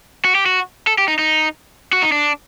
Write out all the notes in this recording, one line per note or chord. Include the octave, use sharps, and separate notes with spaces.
F#4
G4
F#4
A4
G4
D#4
D#4
F#4
D#4
D4